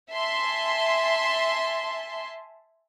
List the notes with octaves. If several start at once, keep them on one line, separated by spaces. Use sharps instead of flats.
E5 G#5 A5 C6